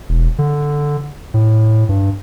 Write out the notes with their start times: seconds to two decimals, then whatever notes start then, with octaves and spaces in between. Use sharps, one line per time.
0.09 E1
0.38 D3
1.34 A2
1.89 G2